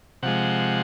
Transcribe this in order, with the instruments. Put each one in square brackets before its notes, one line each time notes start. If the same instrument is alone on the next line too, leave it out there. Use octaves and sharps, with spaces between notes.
[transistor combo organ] C3 F3 G#3 F#5